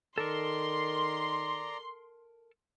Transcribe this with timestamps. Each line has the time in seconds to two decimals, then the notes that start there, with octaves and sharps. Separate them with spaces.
0.18 D#3 A4 A#4 D5 A#5 C6